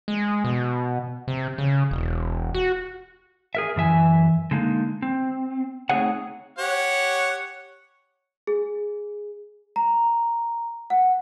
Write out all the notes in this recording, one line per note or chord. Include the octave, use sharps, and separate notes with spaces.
G#3
B2
C3
C#3
E1
F#4
G#4 A#4 E5
F#2 E3 E5 G#5
D3 G#3 A#3 C#4 D#4
C4
A3 C4 D#4 G#4 C#5 F#5
G4 C#5 F#5
G#4
A#5
F#5